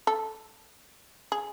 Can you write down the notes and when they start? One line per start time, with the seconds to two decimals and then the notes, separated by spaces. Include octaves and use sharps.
0.07 A4
1.32 G#4